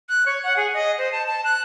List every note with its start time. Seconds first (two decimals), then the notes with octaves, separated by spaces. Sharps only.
0.09 F#6
0.26 C#5
0.44 F#5
0.57 G#4
0.74 D#5
0.98 C5
1.12 A5
1.27 A5
1.44 F#6